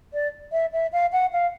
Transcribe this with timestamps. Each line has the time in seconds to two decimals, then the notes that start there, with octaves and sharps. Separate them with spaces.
0.14 D5
0.52 E5
0.73 E5
0.93 F5
1.12 F#5
1.33 F5